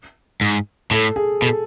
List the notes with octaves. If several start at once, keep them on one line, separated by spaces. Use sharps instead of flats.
G#2
A2 A4
G#4
B2 A4